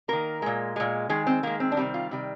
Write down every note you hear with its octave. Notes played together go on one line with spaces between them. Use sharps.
D#3 A#3 A#4
A#2 G#3
A#2 G#3
D#3 G#3 G#4
C4
D#3 G#3 A#3
C4
D4
C3 D#3 G3 C4
F4
C3 D#3 G3